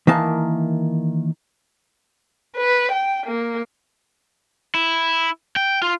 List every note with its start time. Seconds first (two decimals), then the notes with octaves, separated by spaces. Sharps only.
0.07 D#3 E3 A#3 A5
2.56 B4
2.91 G5
3.26 A#3
4.75 E4
5.56 G5
5.82 F4